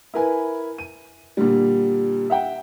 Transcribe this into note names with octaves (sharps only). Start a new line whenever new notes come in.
E4 A#4 B4 G#5
D#7
A#2 D3 G3
E5 F#5 G5